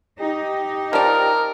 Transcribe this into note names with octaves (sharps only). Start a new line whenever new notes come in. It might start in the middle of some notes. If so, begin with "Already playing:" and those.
D#4 G4
F3 A#4 D5